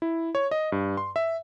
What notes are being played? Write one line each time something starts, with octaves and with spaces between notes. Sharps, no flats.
E4
C#5
D#5
G2
C6
E5